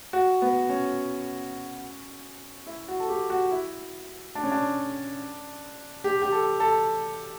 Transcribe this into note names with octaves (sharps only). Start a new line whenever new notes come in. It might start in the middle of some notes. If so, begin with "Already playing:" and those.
F#4
B3
C#4
E4
F#4
A4
G4
F#4
E4
D4
C#4
D4
G4
G4
A4
A4